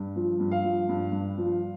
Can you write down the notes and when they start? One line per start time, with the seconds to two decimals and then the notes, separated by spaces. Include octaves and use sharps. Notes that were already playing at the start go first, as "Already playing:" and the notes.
Already playing: G2
0.16 F3
0.40 G2
0.51 F5
0.64 F3
0.89 G2
1.12 G2
1.38 F3